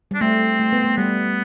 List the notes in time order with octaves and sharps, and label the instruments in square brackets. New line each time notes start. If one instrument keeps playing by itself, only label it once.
[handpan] G3 [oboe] D4
[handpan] A3 [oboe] C4
[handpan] A3
B3
A3
[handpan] G3 [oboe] B3